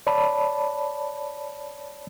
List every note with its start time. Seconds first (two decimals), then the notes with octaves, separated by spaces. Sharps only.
0.07 C#5 D5 A5 B5